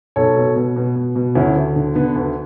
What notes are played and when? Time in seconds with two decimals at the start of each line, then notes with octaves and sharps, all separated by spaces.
0.16 B1 A4 C#5
0.36 B2
0.56 B2
0.76 B2
0.96 B2
1.16 B2
1.35 D2 C#4 E4
1.56 D2
1.76 D3
1.95 D3 B3 D4
2.16 D2